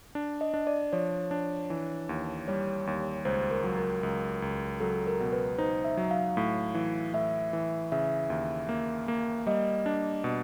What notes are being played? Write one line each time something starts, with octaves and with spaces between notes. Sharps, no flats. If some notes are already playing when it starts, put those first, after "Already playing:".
D4
D#5
D4
D5
F3 C#5
D4
E3
D#2
G3 C#5
D#2
C#2 C5
A#4
F#3
A#4
C#2
C#2
F#3 A4
A#4
B2
B4
D#4 C5
E5
F#3
F5
A2
E3
A2 E5
E3
C#3 E5
D#2
A#3
A#3
G3 D#5
D4
B2